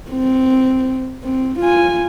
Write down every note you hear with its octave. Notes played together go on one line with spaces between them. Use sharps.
C4
C4
F4 G#5